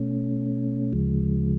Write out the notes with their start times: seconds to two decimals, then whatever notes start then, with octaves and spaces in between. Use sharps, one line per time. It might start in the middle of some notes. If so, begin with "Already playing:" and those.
Already playing: B2 A3 C#4
0.92 D2 C#3 F3 G#3